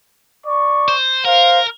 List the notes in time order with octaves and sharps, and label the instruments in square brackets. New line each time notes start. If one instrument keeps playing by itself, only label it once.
[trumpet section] D5 C#6
[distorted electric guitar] C5
[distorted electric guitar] A#4 [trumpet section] C5 F5